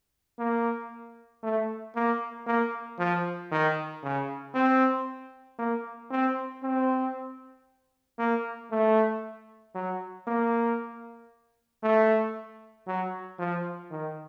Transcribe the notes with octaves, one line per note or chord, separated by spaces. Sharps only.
A#3
A3
A#3
A#3
F3
D#3
C#3
C4
A#3
C4
C4
A#3
A3
F#3
A#3
A3
F#3
F3
D#3